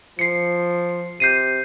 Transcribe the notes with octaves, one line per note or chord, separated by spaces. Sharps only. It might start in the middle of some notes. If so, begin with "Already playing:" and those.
F3 C7 C#7
C3 G6 C7 D#7